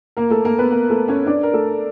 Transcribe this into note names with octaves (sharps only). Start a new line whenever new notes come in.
A#3 A#4
A3 A4
A#3 A#4
B3 B4
A#3 A#4
A3 A4
C#4 C#5
D4 D5
A#4
A3 A4